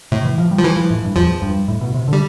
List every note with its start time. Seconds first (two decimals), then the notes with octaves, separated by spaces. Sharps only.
0.12 A2 C3
0.24 E3
0.38 F3
0.51 G3
0.59 F3
0.64 E3 G3
0.77 F3
0.91 A2
1.04 G2
1.16 E2 F3
1.42 G2
1.68 A2
1.81 B2
1.94 C3
2.08 D3
2.13 G3